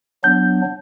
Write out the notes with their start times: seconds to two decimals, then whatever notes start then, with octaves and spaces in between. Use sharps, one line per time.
0.24 F#3 B3 D4 G6